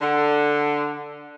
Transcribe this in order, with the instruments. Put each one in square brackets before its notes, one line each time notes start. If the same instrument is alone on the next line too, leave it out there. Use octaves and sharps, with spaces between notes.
[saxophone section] D3